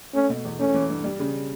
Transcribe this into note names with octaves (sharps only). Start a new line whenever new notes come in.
A3 C#4
B2
E2
A3 C#4
E3
G2
G3
C#3